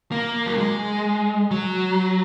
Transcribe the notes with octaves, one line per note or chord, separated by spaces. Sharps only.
A#3
F#3
G#3
F#3